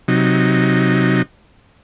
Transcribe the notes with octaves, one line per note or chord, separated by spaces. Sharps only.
C3 F#3 D#4